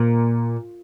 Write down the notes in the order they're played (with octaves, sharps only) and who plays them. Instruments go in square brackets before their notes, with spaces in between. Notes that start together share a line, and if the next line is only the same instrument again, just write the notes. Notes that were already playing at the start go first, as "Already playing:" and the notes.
Already playing: [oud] A#2